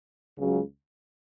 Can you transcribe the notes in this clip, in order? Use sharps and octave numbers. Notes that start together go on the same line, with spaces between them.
C#2 C#3 F#3